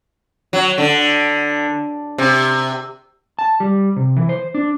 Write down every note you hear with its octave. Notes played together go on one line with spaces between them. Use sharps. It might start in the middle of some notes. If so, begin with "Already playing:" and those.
F#3
D3
C3
A5
G3
C3
E3
C5
D4